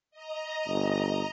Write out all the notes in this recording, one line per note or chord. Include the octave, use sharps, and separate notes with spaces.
D#5 A#5
G1